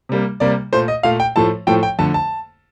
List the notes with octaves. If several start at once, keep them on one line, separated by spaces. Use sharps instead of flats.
C3 G3 A#3
C3 G3 A#3 D5
A#2 A3 C5
D#5
A#2 A3 F5
G5
A2 F3 A3 A5
A2 F3 A3 G5
G5
F2 D3 A3 A5
A5